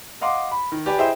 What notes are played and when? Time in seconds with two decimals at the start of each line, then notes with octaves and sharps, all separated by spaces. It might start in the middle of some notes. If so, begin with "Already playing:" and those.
0.21 D#5 F5 F#5 C6 D6
0.52 B5
0.72 D#3
0.86 G4 B4 D5 G#5
0.98 E4 G#4 C5 D#5 E5 G5